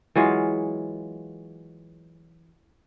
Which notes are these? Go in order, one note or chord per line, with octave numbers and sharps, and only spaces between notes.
E3 F#3 G#3 F4